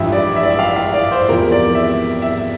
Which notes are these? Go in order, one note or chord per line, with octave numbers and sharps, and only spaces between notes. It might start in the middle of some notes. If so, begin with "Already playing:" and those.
Already playing: A1 G2 F3 E5
D5
E5
D5
E5
F5
F5
D5
C5
E2 C3 F3 A#4
D5
E5
E5